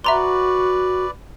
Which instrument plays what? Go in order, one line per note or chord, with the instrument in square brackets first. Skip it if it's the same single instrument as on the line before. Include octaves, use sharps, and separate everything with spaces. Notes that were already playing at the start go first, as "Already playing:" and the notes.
[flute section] F#4 [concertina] B4 D5 [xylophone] E5 A#5 C6